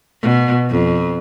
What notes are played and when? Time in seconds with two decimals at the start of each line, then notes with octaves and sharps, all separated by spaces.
0.22 B2
0.70 F2